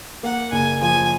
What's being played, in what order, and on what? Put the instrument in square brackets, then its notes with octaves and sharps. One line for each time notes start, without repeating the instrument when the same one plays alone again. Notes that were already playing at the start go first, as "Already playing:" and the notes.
[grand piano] A#3 [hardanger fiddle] F#5
[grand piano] F#1 [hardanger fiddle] G#5
[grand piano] F3 [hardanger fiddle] G#5